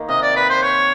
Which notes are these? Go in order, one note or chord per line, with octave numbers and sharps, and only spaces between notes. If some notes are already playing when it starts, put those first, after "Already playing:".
Already playing: D#3 A#3
C3 D#5
D5
B4
C5
C#5